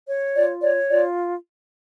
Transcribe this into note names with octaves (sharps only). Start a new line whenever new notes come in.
C#5
F4 D5
C#5 D5
F4 D5